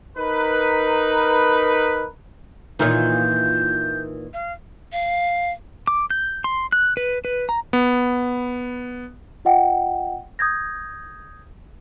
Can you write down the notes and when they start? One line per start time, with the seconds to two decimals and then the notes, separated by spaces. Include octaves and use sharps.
0.17 D#4 A#4 B4
2.79 A#2 D#3 E3 D#4 F4 C#5 G6
4.33 F5
4.92 F5
5.87 D6
6.10 G6
6.44 C6
6.72 F#6
6.97 B4
7.25 B4
7.49 A#5
7.73 B3
9.45 F4 D#5 F#5 G5
10.39 D#6 G6 G#6 A#6